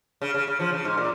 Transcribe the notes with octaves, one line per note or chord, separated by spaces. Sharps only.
C#3
C#3
C#3
F3
C#3
G#2
A#2